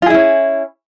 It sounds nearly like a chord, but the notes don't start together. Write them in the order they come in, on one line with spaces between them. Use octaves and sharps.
F4 G#4 E4 C#4